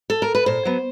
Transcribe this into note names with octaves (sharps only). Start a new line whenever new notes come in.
A4
A#4
B4
A#2 C5
F#3 B3